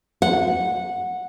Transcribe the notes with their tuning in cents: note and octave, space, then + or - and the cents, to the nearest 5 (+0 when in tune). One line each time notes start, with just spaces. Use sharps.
F#5 -15